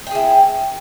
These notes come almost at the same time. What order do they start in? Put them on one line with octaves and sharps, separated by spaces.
G5 G#4 E4